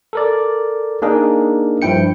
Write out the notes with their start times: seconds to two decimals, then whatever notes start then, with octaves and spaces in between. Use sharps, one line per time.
0.13 A4 A#4 D5
1.02 A#3 D4 D#4 G#4 A#4
1.82 G2 F3 E4 G5 C#7